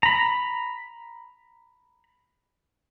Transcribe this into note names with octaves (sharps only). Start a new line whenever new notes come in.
A#5 B5